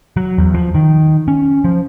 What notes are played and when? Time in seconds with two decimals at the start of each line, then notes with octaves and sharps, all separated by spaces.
0.17 F#3
0.38 E2
0.54 F3
0.75 D#3
1.28 C#4
1.64 F3